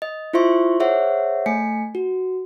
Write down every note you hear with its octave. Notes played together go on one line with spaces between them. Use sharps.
D#5
E4 F4 C5 E5 C6 C#6
G#4 C5 C#5 E5 F#5
A3 G#5 B6 C#7
F#4